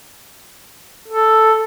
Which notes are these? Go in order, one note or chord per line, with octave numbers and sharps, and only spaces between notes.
A4